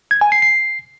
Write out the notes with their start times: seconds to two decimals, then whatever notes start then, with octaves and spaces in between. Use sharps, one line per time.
0.11 G#6
0.21 G#5
0.32 C7
0.42 C7